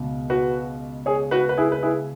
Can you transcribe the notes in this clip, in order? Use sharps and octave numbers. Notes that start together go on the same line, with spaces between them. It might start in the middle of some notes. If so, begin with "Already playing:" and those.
Already playing: C#2 B2
F#4 B4
G#4 C#5
F#4 B4
B4
E4 G#4
B4
E4 G#4